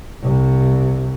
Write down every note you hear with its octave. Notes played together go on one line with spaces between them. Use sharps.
C2 C3